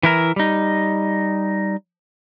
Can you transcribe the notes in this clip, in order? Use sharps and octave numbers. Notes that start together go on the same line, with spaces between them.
E3 E4 A#4
G3 D#4